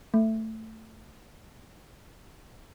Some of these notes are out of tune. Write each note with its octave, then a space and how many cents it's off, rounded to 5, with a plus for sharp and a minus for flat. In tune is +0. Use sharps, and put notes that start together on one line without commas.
A3 +10